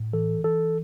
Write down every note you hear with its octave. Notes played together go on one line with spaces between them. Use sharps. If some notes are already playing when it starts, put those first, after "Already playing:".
Already playing: A2
E3 A4
E3 A4